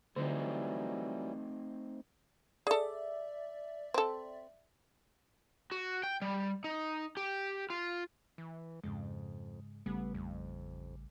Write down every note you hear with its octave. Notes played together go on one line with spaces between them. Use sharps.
D3 E3 F#3 G3 A3 C4 D#4
G#4 A4 D5 E5
C4 A4
F#4
G5
G3
D#4
G4
F4
E3
F2 G#2 C#3 G#3
A1 C#3 G3 A3 B3
F2